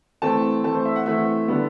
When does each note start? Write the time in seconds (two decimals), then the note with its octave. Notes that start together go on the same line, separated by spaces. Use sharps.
0.22 E3 A3 C4 A5
0.64 E3 A3 C4 A5
0.75 C5
0.85 E5
0.96 F#5
1.06 E3 A3 C4 E5
1.48 D3 G3 B3